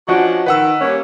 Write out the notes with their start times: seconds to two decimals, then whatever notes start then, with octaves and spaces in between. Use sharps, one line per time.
0.08 F3 C#4 D4 F#4 D#5 F#5
0.46 D#3 B4 F#5 E6
0.81 G3 A#3 C#4